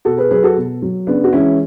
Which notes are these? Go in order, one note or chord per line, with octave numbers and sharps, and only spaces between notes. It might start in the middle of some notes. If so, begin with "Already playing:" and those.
B2 F#4 A4
G#4 B4
F#3 G#4 B4
F#4 A4
B2
F#3
C#3 B3 D4
F#4
E3 G#3 C#4 E4